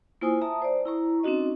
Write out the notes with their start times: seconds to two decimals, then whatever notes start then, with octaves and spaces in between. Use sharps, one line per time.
0.21 A#3 E4 F4 C5 G#5 D#6
0.41 E5 A5 A#5 D#6
0.62 C5 D5
0.85 E4 A#5 C#6
1.23 C4 C#4 D#4 F#4 D#5